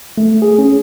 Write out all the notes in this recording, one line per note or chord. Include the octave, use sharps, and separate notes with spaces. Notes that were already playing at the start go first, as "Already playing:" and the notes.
A3
G#4
C#4